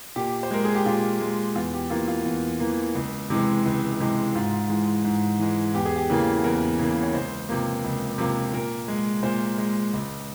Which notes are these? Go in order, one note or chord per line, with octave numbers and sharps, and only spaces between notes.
A#2 G4
C5
G#3 A#4
G#4
G4
A#2 F4
G#3
E2 F4
G4
E3 A#3 F4
F4
E2
E3 A#3
C#2
C3 E3 G#3
C#2
C3 E3 G#3
G#2 F4
E3 G#3
G#2
E3 G#3
E2 G4
G#4
G4
C#3 E3 A#3
E2 A#4
C#3 E3 A#3
C#5
C#2 C5
C3 F3 A#3
C#2
C3 F3 A#3
A#2 A#4
G#3
A#2 C5
G#3
C#2